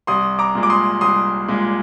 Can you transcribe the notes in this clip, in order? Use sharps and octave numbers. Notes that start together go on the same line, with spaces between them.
C2 C6 D#6
A#5 D6
A#2 G#3
D6
C6 D#6
C2 C6 D#6
A#2 G#3